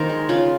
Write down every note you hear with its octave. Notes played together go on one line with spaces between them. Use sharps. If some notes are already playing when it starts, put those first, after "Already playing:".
Already playing: D#3 A#3 A#4 C5
G#3
C#3 F4